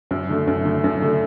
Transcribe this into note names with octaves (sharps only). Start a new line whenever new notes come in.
F#2
D3 A3
F#2
D3 A3
F#2
D3 A3